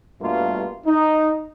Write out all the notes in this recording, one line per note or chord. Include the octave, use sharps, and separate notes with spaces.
G2 B2 G3 A3 A#3 F4
D#4